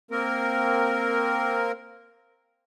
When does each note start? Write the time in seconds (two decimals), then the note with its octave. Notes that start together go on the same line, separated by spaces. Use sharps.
0.11 A#3 C4 A#4